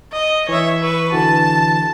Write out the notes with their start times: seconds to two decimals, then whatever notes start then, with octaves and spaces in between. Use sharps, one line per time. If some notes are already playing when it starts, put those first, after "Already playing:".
0.12 D#5
0.49 E3 C#5 E5
0.81 B4 C#6
1.12 D3 E3 F#4 A5